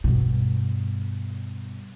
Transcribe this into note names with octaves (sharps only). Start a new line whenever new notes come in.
G2 B2